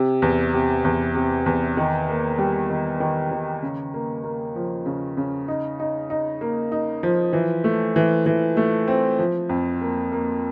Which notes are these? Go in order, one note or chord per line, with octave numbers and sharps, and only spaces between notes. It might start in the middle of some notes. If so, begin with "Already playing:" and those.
Already playing: C3
E2
C3
E2
C3
E2
D#3
A#3
G3
D#3
D#3
D#3
C#3
A#3
A#3
F3
C#3
C#3
D#4
D#4
D#4
A#3
D#4
F3
E3
A3
E3
E3
A3
C4
F3
F2
A#3
A#3